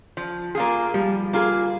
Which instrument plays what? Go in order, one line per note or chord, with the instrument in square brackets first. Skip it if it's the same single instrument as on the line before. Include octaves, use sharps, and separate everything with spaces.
[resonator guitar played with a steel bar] F3
A#3 F4 G#4
[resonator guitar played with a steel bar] F3 [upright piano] G3
[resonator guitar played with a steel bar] A#3 F4 G#4